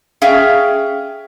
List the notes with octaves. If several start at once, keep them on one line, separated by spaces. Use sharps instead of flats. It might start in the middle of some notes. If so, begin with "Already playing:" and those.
C#4 G#4 E5 F5 G5